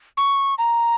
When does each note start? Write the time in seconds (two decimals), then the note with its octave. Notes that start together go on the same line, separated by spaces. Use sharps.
0.17 C#6
0.58 A#5